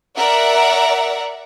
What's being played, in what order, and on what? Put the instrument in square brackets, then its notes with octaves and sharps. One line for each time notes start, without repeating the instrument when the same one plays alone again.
[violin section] A#4 D5 E5 F#5 A#5